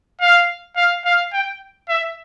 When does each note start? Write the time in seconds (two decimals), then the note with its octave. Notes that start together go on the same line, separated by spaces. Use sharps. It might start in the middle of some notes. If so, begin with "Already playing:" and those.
0.21 F5
0.76 F5
1.05 F5
1.33 G5
1.89 E5